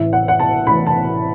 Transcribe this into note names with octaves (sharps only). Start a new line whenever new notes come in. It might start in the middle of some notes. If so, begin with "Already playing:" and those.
Already playing: A1 A2 E3 E5
F#5
F#5
A5
A1 A2 E3 B5
A5